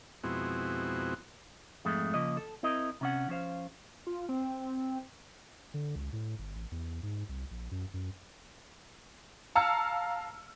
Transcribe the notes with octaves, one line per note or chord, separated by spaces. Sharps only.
F2 B2 G#3 C4 E4 F#4
F2 G#2 G#3 A3
C#3 F3 A#3 D#5
A4
C4 E4 A#4 D#5
C3 C#4 F#5
F3 C#4 C5 F5
F4
C4
D3
C#2
A2
G1
A1
E2
G#2
C2
A#1
F#2
F#2
F5 A5 A#5 E6 F6 C#7